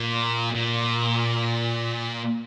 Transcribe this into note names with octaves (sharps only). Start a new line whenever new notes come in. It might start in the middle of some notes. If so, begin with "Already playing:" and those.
Already playing: A#2
A#2